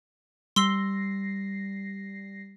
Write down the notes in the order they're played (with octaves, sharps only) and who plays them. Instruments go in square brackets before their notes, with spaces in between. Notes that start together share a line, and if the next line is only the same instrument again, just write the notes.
[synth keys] G3 A#6 C7 [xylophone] C6 E6 G7